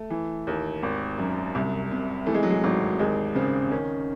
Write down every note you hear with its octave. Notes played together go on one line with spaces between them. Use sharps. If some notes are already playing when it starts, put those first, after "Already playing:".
Already playing: A3
E3
D#2
G#1
F#2
C2
C3
E3 A3
G#3
F#3
G#3
G#1 F#3
D#2 G#3
C#3 C4
D#3 C#4